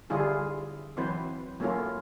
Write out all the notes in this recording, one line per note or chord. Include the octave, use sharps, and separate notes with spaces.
D3 G3 E4 F4 G#4
E3 F#3 C4 B4 C5
F#3 A3 A#3 C#4 E4 F4